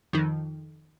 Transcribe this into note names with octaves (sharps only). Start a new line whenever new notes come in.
F2 D#3